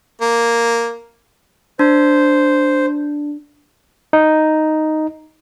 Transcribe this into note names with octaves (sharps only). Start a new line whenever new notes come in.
A#3
D4 C5
D#4